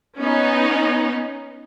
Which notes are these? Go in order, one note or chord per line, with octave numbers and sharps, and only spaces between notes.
B3 C#4 D#4